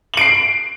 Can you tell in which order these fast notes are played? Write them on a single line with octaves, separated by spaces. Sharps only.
F#7 D7 C7